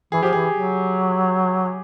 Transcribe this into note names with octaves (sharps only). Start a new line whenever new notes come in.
E3 G#4
F3 G4
E3 G#4
F#3